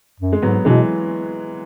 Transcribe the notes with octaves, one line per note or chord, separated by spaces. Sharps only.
F#2
G#3
G#2 F#3 B3
B2 E3 G#3